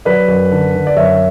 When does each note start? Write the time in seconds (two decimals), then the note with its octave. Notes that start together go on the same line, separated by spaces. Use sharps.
0.05 F#3 B4 D5
0.28 F#2
0.52 D3
0.75 D3
0.87 D5
0.97 F#2 C#5 E5